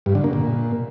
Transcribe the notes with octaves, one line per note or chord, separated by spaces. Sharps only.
G2
D3
A#3
A#2